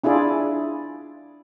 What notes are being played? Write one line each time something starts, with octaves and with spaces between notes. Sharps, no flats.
D4 E4 F4 G#4 D5